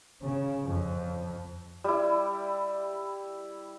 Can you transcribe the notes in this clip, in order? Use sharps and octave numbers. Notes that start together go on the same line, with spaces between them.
C#3
F2
G3 E4